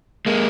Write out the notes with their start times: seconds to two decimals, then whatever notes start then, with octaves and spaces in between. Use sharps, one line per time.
0.26 G#3 A#3